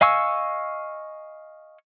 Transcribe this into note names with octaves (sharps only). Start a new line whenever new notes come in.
D#5 F5 G#5 C#6 E6